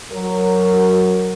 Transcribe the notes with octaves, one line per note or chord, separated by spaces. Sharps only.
F#3 A#4